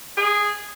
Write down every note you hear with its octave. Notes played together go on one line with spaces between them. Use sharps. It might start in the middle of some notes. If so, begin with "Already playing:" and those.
G#4